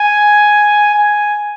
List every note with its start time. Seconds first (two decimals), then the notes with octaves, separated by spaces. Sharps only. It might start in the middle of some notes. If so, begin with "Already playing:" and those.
Already playing: G#5
0.94 G#5